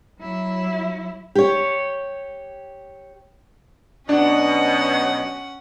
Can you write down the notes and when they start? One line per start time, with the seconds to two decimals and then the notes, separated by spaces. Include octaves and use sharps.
0.19 F#3 E4
1.35 G4 C#5
4.09 B2 F#3 C#4 D4 D#5 F#5